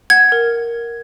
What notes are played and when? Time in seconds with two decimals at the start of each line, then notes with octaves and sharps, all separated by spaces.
0.10 F#5 G#6
0.32 A#4